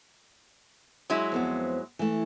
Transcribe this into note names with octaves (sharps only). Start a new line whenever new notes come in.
F#3 G#3 E4
F2 B3 C5
E3 A3